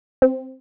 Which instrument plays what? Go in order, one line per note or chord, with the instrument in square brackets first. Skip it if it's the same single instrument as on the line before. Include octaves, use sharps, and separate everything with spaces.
[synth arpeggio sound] C4